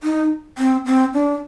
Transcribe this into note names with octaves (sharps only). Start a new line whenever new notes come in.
D#4
C4
C4
D4